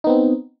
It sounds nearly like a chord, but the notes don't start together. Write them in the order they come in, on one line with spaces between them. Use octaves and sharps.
D#4 B3 C4